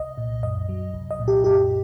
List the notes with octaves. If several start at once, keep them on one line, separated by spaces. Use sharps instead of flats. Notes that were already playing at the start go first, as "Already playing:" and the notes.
Already playing: C2 D#5
A#2
F#2 D#5
F#3
C2
D#5
A#2
G4
F#2 G4